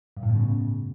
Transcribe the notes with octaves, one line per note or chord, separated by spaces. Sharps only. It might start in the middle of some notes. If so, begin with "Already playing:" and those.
G2
A2
B2
C#3